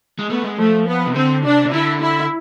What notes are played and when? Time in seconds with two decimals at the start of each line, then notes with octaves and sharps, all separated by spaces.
0.19 G#3
0.30 A3 B3
0.44 G#3
0.58 F3 A3
0.87 B3
1.07 C3
1.16 D3 C4
1.44 C3 D4
1.67 C3
1.73 D3 E4
2.02 E4